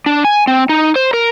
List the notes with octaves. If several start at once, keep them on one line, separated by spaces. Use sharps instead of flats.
D4
G#5
C4
D#4
C5
A#4